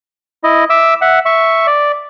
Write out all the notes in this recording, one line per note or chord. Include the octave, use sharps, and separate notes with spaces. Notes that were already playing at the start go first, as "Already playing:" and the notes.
E4 D#5
E5 D6 E6
E5 F#5
E5 C#6
D5